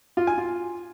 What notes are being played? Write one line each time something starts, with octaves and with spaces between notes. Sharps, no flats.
F4
G#5
F4